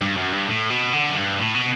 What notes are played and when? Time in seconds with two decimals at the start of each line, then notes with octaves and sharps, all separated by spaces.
0.02 G2
0.17 F#2
0.32 G2
0.47 A2
0.70 B2
0.93 D3
1.10 F#2
1.16 G2
1.39 A2
1.54 B2